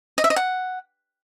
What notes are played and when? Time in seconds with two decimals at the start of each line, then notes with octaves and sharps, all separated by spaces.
0.18 D#5
0.24 E5
0.30 D#5
0.36 F#5